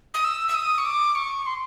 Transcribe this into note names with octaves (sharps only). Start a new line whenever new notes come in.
D#6
E6
E6
D#6
C#6
D6
C#6
C6